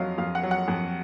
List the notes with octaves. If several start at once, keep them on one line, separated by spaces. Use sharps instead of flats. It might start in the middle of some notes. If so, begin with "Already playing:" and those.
Already playing: F2 F#3 D#5 F5
F2 F5
F#5
F#3
F#5
F2